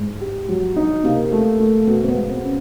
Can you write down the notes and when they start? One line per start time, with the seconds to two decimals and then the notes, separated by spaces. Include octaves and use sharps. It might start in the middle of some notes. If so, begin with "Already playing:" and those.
Already playing: G#2
0.21 G4
0.49 F#3
0.76 D#4
1.04 C3 A#3
1.32 A3
1.60 A3
1.87 B2 B3
2.03 C4
2.08 B3
2.15 G#3
2.29 C4
2.43 C#4